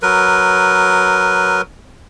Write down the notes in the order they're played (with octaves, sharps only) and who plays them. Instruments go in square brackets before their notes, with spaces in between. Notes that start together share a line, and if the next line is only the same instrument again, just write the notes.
[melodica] F#3 A#4 B4